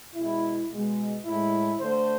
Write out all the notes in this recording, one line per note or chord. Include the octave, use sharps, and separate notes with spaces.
B2 G#3 E4
B2 G#3
A2 G#3 E4
D3 A3 C5